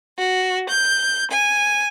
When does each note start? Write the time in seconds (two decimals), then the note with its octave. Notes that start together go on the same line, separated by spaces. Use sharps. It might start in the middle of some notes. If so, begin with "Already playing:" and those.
0.18 F#4
0.68 G6
1.30 G#5